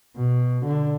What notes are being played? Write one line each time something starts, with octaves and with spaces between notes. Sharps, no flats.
B2
D3